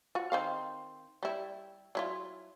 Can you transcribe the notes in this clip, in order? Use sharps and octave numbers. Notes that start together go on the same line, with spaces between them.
F4 F#4
D#3 C4 F5
G3 E4
F#3 E4 F4